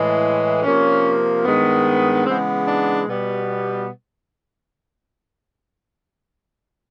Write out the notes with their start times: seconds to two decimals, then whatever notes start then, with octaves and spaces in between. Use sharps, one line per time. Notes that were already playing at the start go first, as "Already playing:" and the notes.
Already playing: A2 E3 G#3
0.63 C3 F3 A#3 C#4
1.44 G2 D#3 G#3 B3
2.25 C#3 E3 G#3 B3 C4
2.66 D4
3.07 B2 G3 B3